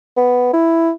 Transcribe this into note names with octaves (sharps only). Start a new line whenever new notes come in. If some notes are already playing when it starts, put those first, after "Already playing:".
B3
E4